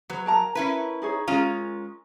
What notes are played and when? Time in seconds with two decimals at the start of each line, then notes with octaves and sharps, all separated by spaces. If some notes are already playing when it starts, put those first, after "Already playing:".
0.10 F#3 B4
0.26 A#4 A5 A#5
0.55 C#4 E4 B4
1.02 D#4 G#4 C#5
1.28 G#3 C#4 F4 G#4 A#4